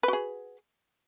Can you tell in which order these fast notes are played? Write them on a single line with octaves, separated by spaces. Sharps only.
B4 F#4 G#4